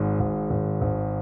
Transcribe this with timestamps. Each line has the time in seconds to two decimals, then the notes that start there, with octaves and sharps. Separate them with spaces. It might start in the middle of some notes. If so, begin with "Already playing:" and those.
Already playing: G#1 G#2
0.20 G#1
0.50 G#1
0.82 G#1